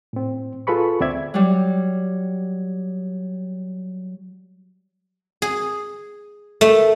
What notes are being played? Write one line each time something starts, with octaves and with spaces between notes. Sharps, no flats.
A2 C4
F4 G#4 A4 B4 B5 C#6
D2 C4 D5 E5 G#6
F#3 G3
G#4
A3